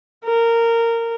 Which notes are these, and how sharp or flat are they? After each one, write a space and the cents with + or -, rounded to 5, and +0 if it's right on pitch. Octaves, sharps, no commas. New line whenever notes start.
A#4 -15